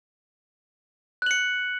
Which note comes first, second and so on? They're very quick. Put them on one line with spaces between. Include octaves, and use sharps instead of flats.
F#6 F#7 C#7